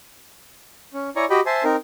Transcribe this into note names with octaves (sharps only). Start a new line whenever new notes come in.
C#4
E4 C#5 D5 G#5 A#5 C#6
F#4 G4 D#5 G5 B5
C5 E5 G#5 A5 C6
C4 D#4 A#4